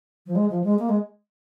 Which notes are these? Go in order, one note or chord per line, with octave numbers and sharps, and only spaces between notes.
F3
G#3
F3
G#3
A#3
G#3